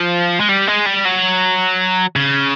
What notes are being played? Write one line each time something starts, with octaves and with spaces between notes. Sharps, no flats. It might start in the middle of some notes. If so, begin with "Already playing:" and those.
Already playing: F3
G#3
G3
G#3
G3
F#3
C#3